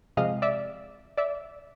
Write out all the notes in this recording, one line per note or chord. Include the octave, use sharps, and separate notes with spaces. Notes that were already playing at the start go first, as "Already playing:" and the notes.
C3 F3 G#3 D#5 F5
D5 E5
D5 E5